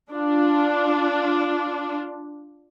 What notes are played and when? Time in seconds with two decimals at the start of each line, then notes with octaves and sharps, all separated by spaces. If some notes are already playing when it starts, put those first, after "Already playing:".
0.12 D4 F4